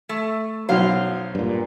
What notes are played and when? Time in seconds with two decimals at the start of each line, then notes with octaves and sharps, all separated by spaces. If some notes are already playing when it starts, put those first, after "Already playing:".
0.09 A3
0.69 B1 F#2 F#3 C5 F5
1.35 G2 A#2